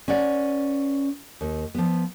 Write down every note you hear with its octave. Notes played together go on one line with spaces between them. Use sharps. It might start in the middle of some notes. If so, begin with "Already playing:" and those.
C#4 B4 D5 F#5
D#2
F3 B3